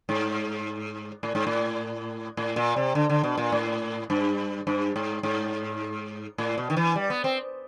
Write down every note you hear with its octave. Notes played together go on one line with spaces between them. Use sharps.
G#2
A2
G#2
A2
A2
A#2
C3
D3
D3
B2
A#2
A2
G2
G2
G#2
G#2
A2
B2
D#3
E3
G3
B3
C4